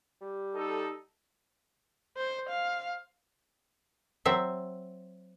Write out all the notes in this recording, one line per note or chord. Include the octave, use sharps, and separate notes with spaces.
G3
D#4 A4
C5
F5
F#3 C4 E5